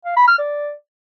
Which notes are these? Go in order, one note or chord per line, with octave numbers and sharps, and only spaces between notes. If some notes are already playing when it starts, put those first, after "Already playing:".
F5
B5
F6
D5